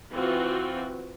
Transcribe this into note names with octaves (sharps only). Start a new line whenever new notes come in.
E3 C4 F4 F#4